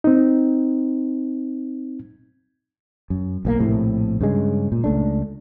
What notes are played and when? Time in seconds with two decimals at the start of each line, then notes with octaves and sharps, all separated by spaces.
0.04 C4 D#4
3.10 F#2
3.45 B1 E3 A#3
3.59 A#1 A2 C3
4.21 G2 C#3 G#3
4.72 A#2
4.84 C#2 A3 D4